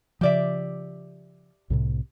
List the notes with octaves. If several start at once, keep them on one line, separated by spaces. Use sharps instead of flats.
C#3 F3 G4 D5 E5
C2 A2 C3